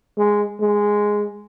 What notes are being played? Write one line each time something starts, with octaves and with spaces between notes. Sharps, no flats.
G#3
G#3